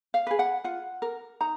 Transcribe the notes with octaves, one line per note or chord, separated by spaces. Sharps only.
F5
G#4 B4
F#5
F4 F#5
A#4
D#4 A#5